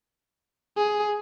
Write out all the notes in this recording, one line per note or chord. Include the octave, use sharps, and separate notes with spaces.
G#4